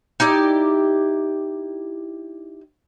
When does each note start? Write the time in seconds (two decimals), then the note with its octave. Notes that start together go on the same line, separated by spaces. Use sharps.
0.20 D#4 E4 G4 D5